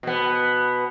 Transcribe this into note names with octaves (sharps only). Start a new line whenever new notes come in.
B2 B3